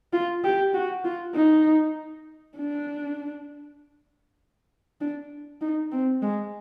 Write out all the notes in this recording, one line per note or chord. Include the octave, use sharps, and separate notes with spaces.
F4
G4
F#4
F4
D#4
D4
D4
D#4
C4
G#3